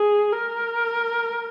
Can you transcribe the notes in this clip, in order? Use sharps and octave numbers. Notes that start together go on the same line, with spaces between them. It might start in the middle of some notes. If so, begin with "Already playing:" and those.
Already playing: G#4
A#4